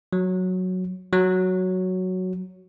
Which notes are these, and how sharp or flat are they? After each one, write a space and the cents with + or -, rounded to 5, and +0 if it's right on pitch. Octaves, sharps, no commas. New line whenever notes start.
F#3 -5
F#3 +0